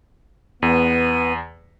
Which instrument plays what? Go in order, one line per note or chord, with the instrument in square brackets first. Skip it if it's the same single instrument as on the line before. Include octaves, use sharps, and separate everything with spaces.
[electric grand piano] E2 [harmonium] B3 [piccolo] D#7